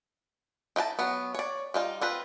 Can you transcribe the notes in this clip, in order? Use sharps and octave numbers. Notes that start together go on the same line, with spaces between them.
D#4 E4 G5 A5
F#3 B3
C#5 D5
G3 D#4 F4
C4 F4 B4